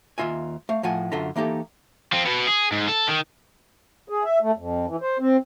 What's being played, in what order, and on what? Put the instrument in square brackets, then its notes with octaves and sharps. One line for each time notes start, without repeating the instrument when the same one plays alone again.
[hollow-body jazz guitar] D#2 D#3 F4 E5 G#5
A3 F5
A2 F3 F#5 G#5
F#2 D3 F4 A4 E5 A#5
E3 A#3 D#4 G4 A4
[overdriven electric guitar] F3 C4
B2 B3
G#4
G#2
A4
D#3
[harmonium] G#4
E5
A3
F2
E3
C5
C4